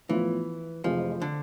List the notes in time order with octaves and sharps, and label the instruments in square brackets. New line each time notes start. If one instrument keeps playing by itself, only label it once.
[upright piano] A2 F3 B3 F4 [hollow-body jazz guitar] E3
[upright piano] F1 F2 E3 G#3 [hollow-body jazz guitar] F3
[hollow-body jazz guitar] D3